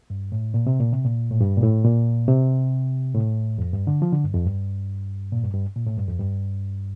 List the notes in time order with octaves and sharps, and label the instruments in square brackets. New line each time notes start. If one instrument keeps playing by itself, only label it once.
[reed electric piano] G2
A2
A#2
C3
A#2
C3
A#2
A2
G2
A#2
A2
A#2
C3
A2
F2
G2
D3
F3
D3
G2
F2
G2
A#2
G2
G2
A#2
A2
G2
F2
G2